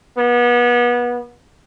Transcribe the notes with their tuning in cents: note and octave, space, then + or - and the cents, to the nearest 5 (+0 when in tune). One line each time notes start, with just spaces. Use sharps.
B3 -30